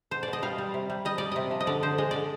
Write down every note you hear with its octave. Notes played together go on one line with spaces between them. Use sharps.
B2 C5
D5
B2 D#5
G3 F5
G3
C3
G3
G3 D#5
G3 D5
C3 D#5
F3
D#5
D3 D5
D3 C5
G#3 D#5
D3 D5